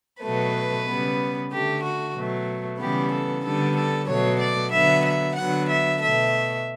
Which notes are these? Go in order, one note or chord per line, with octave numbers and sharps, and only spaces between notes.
B2 F#3 A3 B4
C#3 G3 B3
D3 A3 G4
F#4
B2 F#3 A3
C#3 E3 G3 B3 G4
A4
D3 G3 B3 A4
A4
B2 F#3 A3 C#5
D5
D3 F#3 B3 E5
E5
D3 F#3 B3 F#5
E5
B2 A3 E5